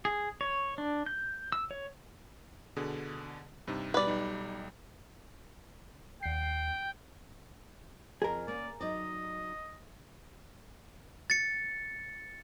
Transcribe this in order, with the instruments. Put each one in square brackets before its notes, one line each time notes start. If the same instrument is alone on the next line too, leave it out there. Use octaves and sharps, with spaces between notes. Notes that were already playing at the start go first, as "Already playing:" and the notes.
[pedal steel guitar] G#4
C#5
D4
G6
E6
C#5
[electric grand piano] B2 D3 G#4
G2 C3 D#4
[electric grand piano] B2 G3 [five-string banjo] B4 D5
[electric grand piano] B1 G3 D#4
[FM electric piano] D#2 C7 [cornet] G5
[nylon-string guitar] F2 [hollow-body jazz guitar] G#4 A#4
[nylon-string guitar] A#3 C#4 [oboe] D5
[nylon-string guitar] F#3 D#4 D5 [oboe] D#5
[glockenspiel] A6 C#7